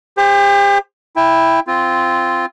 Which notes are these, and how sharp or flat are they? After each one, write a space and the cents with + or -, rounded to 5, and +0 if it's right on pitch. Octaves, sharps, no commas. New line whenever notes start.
G4 +40 C5 +0
E4 +0 G5 +10
C4 +0 F4 -10